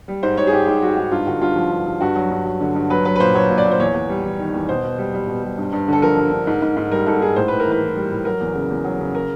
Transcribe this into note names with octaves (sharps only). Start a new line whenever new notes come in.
G3
G#2 C5
G#2 C#5
G#4
G#2 G4
G#2 G4
G3 F#4
G#2 F#4
G2 F4
D3 F#4
G2 F4
F3
G2
G2
G2 F#4
F#3
G2
F#3
D3
G2
F#3 B4
F#3 B4
B4
A#2 C5
F#3 C#5
A#2
D5
A#2
C5
E2 C#5
E2
G3
E2
D#3
E2
B2 C5
B2
G3
G3
B2
G3
G2
G2
D3 A4
F3 A#4
G2
D3
G#2
G#2
G#2
G3 A#4
G#2 A4
G#2 G#4
A2 C5
A2 B4
A#4
E3
B4
E3
G3
A2
F#3 A#4
E2
C#3
E2
F#3
C#3
A#4